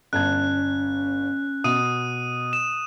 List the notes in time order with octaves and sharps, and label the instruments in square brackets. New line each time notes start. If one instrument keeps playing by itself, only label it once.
[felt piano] G1 A5 G#6 [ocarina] C#4 [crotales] F#6
[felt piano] B2 [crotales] D#6 D#7
[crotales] E7